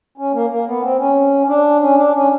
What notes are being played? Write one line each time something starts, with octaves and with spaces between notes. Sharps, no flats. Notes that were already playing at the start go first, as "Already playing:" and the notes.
C#4
A#3
A#3
B3
C4
C#4
D4
C#4
D4
C#4